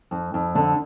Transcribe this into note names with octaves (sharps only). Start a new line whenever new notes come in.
F2
F2
D3 D4